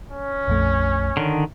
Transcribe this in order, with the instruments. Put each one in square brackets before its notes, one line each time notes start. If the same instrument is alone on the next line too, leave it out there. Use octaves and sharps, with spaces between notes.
[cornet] C#4
[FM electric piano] A#1 F2 A3
[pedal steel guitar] D3 D#3